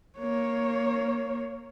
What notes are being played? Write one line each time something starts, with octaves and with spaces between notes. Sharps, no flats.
A#3 C#5